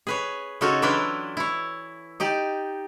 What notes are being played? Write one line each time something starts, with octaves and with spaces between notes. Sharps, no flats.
G#4 B4 C#5
C#3 D#4 F4 F#4 A4 C#5
E3 F#3 D4 E4 F4 B4
E4 C#5
D#4 G4 D5